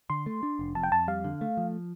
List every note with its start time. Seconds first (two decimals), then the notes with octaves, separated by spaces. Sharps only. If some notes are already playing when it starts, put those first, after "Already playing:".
0.10 D3 C6
0.26 A3
0.43 D4
0.59 F1
0.75 F2 A5
0.83 G5
0.92 F2 A5
1.08 G3 F5
1.24 D3
1.41 A3
1.57 F3